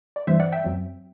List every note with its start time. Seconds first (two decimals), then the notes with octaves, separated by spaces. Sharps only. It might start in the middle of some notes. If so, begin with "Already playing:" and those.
0.16 D5
0.27 G2 E3 G3 C4 C5 E5
0.40 D5 F#5
0.52 E5 G5
0.64 F#2 F#3 C4